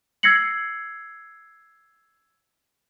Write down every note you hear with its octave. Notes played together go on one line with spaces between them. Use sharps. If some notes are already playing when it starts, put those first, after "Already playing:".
E6 G#6 A#6 C7 C#7 F#7